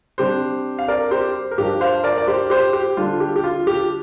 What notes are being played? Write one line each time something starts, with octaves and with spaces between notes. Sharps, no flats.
C3 G3 D4 G4 C5
F5
A#4 D5
G4 C5
A#4
G2 F3 D4 G4
C5 F5
A#4 D5
D5
G4 C5
G4 C5
G4
D3 G3 D4 F4
G4
G4
F4
G4